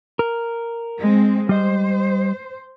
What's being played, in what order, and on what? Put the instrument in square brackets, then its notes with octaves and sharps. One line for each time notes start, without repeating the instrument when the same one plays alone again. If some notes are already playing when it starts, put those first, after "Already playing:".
[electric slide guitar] A#4
[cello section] G#3 C4
[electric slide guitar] G3 D#5 [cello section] C5